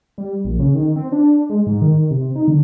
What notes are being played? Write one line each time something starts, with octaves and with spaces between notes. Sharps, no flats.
G3
A#1
C#3
D#3
C4
D4
G#3
G#2
D#3
C3
D#4
D3